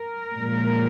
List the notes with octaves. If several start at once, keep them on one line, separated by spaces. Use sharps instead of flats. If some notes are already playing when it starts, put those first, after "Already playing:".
Already playing: A#4
A#2 F3 G#3